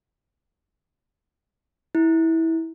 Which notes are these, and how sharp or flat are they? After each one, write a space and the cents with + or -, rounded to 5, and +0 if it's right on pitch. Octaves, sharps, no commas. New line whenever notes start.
E4 -20